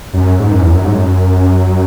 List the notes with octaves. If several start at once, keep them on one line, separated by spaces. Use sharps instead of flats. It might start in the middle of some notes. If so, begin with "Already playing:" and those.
F#2
G#2
F#2
E2
F#2
G#2
F#2